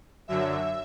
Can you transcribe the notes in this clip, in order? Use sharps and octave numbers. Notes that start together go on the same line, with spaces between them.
F#2 D3 F#3 E5